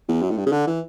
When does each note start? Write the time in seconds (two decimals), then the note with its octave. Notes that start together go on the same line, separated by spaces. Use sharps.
0.08 E2
0.22 F#2
0.31 A2
0.38 G2
0.46 C#3
0.52 D3
0.67 E3